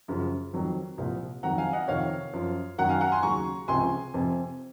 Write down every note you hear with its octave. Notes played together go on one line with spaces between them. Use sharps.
F#2 C#3 F3
F2 D#3 F#3
C2 A#2 F3
F2 D#3 F#3 F#5 A#5
F5 G#5
D#5 F#5
F2 C3 D#3 C#5 F5
F#2 F3
F#2 D#3 F#3 F#5 A#5
F5 G#5
F#5 A#5
G#5 C6
D#2 C#3 F#3 A#5 C#6
C#2 C3 F3 G#5 C6
F2 C3 F3